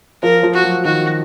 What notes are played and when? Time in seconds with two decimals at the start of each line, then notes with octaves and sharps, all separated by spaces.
0.22 F3 A#4
0.43 F3
0.53 F#4
0.64 F#3
0.85 D#3 F#4